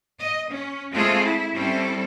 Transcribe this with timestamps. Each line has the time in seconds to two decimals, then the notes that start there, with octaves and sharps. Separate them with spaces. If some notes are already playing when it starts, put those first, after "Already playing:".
0.19 D#5
0.50 C#4
0.91 G#3 A3 C4 F4 G#4 A4
1.22 E4
1.53 G3 C4 C#4 E4 A4